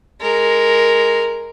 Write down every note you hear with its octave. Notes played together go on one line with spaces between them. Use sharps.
G#3 A#4